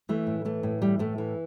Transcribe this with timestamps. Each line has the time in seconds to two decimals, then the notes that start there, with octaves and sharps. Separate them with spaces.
0.09 E3 A3
0.27 A2
0.45 E3 A3
0.63 A2
0.81 E3 G3
0.99 A2 A3
1.18 E3